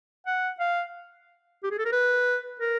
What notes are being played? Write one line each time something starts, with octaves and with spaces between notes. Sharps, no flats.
F#5
F5
G4
G#4
A4
A#4
B4
A#4